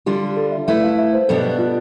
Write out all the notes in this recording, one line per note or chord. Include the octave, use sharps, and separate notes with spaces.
D3 G3 D4 F4 G4
A4
E5
A3 E4 B4 E5
F5
E5
C5
B2 G3 B3 D4 A4
F4